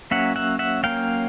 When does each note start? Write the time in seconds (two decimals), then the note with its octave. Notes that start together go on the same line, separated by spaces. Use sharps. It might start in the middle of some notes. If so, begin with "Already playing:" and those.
0.11 F#3 A#3 C#4 E5 F#5
0.36 E5 F#5
0.59 E5 F#5
0.83 F#3 A#3 C#4 F5 G5